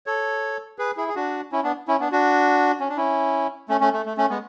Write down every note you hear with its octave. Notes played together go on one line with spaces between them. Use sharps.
A4 C#5
G#4 B4
E4 G#4
G#4
D4 F#4
C#4 E4
B3 D4
C#4 E4
B3 D4
D4 F#4
C#4
D4
C#4 E4
A3 C#4
A3 C#4
A3
A3
A3 C#4
G#3 B3